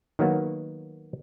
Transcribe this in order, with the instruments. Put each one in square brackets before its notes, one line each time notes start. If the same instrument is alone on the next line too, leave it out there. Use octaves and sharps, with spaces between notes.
[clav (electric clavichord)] D#3 F#3 A#3 B3